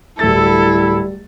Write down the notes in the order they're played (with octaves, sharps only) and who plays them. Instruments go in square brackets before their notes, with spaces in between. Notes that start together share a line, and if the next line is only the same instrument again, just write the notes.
[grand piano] D1 A6 [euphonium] G3 [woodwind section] E4 [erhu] A4